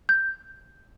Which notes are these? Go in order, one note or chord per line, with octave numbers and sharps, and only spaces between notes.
G6